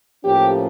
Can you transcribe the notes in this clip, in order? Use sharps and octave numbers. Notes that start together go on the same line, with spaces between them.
A2 F3 A#3 C#4 G4